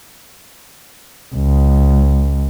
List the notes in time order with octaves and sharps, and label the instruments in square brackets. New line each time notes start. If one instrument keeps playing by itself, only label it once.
[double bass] C#2